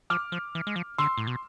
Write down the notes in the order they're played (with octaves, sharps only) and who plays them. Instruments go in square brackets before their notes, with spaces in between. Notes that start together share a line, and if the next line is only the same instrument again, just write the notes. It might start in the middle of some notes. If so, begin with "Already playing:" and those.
[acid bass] F3 [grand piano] D6 F6
[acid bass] F3
E3
G#3
F3
[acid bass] D3 [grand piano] C6 E6
[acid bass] A2
B2